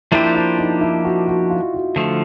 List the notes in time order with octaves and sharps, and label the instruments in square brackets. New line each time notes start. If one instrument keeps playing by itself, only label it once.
[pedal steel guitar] F3 A#3 D4 G4 C5 [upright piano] E4
[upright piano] E4
D#4
E4
F#4
F#4
F4
F#4
[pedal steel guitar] D3 F3 A3